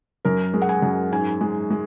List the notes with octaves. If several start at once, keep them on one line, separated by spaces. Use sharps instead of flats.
F#2 A#4
G#3
F#5
G#5
F#2
G#2 G#5
G#3
G#3